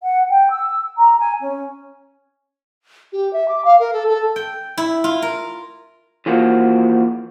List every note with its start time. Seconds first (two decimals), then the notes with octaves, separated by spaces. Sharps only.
0.02 F#5
0.30 G5
0.51 E6
0.98 A#5
1.19 G#5
1.41 C#4
3.13 G4
3.33 E5
3.48 D6
3.65 F5
3.79 A#4
3.93 A4
4.08 A4
4.36 G5
4.77 E4
5.04 F4
5.22 A#4
6.26 E3 F3 A#3 F#4